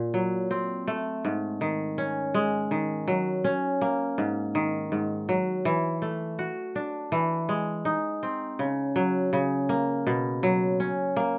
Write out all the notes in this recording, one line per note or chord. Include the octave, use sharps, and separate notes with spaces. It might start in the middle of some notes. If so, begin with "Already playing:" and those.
Already playing: A#2
F#3
C4
A3
G#2
D#3
C#4
G#3
D#3
F#3
C#4
A#3
G#2
D#3
G#2
F#3
E3
A3
F#4
D4
E3
G#3
D#4
C4
C#3
F#3
C#3
A#3
B2
F#3
C#4
A#3